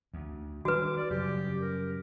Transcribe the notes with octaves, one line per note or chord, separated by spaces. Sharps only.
D2
D#3 E3 G3 F#4 B4 D6
D5
F#2 C#3 G3 G4
A#4